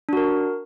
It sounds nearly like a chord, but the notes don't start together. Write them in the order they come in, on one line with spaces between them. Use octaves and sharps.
D4 F#4 A#4